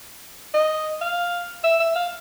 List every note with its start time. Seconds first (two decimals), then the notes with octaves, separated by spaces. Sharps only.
0.54 D#5
1.01 F5
1.64 E5
1.80 E5
1.96 F5